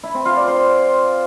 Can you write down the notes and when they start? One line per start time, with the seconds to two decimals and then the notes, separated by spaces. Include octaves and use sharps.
0.03 E4
0.14 C4
0.25 F4
0.36 D5
0.47 C5